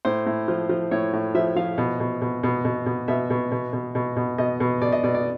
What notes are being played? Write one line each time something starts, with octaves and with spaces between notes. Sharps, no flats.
A2 C5
A2
F3
F3
A2 C#5
A2
F3 E5
F3 F5
B2
B2
B2
B2
B2
B2
B2 E5
B2
B2
B2
B2
B2
B2 D#5
B2
B2 D5
D#5
B2 D5
D5